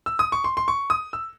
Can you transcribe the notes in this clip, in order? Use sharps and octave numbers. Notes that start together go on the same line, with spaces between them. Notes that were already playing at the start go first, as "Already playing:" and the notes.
E6
D#6
C#6
C6
C6
C#6
D#6
E6